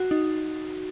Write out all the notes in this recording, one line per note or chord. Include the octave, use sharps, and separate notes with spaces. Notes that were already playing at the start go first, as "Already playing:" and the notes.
Already playing: F#4
D#4